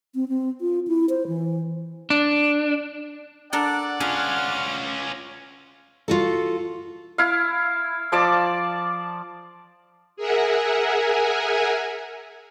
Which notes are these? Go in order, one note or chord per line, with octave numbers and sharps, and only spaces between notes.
C4
C4
F4
E4
C5
E3
D4
D4 A4 A#4 D5 F#5 F#6
C#4 F4 G#4 F6
F4 F#4 A4
E4 F5
F3 D5 A5 D6
G#4 A#4 E5 F#5 G#5